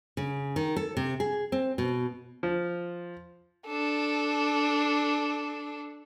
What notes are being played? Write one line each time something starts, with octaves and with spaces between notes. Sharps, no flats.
C#3
D#3
A4
C3
G#4
C4
B2
F3
D4 A4